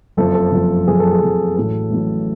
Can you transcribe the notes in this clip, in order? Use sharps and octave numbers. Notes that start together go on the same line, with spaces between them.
F#1 F2 F3 A4
A4
F#1 F2 F3
F#1 F2 F3 G#4
A4
G#4
F#1 F2 F3
A1 A2 F#3 A4
A1 A2 F#3